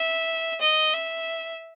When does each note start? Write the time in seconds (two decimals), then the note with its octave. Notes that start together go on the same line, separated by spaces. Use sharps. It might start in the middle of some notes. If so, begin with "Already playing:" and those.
Already playing: E5
0.61 D#5
0.93 E5